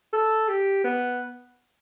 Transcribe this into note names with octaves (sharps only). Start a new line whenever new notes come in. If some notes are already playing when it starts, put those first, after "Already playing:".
A4
G4
B3